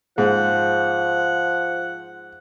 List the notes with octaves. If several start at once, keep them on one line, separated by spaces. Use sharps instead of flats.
G#2 F3 F#5